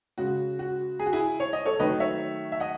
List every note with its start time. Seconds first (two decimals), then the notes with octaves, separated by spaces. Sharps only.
0.18 C#3 G#3 F#4
0.59 F#4
0.99 G#4
1.06 F#4
1.13 E4 G#4
1.40 C#5
1.53 D#5
1.65 A4 C#5
1.80 D#3 F#3 A3 B4 D#5
2.00 C#5 E5
2.52 E5
2.60 D#5 F#5